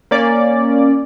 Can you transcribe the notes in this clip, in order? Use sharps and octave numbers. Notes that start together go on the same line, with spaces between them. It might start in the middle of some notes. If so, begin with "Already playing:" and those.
A#3 C#4 D5